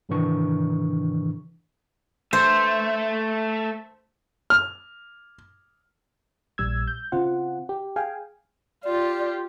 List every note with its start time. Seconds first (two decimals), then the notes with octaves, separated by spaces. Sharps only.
0.09 G#2 C3 D#3 E3 D4 C#6
2.33 A3 C5 E5
4.50 F6
6.58 A#1 G3 E6 G#6
6.87 G6
7.12 C#3 C4 F4 F#5
7.69 G4
7.96 G#4 F5 G5 G#5
8.84 F4 G4 D5